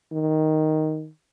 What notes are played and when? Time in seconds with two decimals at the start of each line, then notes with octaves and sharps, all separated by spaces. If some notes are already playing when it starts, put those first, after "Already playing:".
0.12 D#3